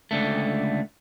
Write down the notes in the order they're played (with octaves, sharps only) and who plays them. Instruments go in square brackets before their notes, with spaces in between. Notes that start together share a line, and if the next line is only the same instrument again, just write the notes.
[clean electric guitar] C#2 D3 A3